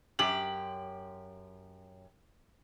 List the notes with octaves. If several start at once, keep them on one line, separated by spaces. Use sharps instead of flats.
F#2 G4 F#7